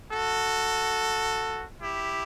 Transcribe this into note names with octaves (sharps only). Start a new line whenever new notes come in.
F#4 A4
E4 G4